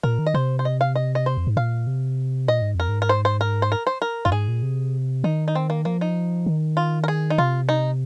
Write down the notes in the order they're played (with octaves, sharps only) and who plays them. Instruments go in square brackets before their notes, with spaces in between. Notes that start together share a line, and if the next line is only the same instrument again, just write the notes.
[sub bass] A#2 [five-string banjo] A#4
[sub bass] D#3
[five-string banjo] D#5
[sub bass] C3 [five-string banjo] C5
[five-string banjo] C5
D#5
F5
D#5
D#5
C5
[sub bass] F2
G#2
[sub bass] A#2 [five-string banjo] F5
[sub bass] C3
[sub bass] A#2 [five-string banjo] D#5
[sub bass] G#2
[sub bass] F2 [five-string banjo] A#4
[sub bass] G#2
[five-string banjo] A#4
C5
C5
A#4
C5
A#4
C5
A#4
[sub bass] F2 [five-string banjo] F4
[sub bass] G#2 [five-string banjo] G#4
[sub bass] A#2
C3
[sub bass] D#3 [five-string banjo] D#4
[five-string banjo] D#4
C4
A#3
[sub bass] F3 [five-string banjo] A#3
[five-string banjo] D#4
[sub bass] D#3
[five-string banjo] F4
A#4
G#4
D#4
[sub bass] C3 [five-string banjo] F4
[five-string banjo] D#4